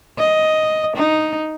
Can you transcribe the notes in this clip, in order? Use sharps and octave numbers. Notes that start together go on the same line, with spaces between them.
D#5
D#4